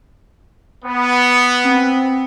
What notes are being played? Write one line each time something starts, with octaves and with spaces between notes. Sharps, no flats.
B3
C4